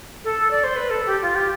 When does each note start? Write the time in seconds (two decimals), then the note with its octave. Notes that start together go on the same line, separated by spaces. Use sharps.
0.24 A4
0.50 D5
0.64 C5
0.76 B4
0.90 A4
1.06 G4
1.22 F4
1.35 G4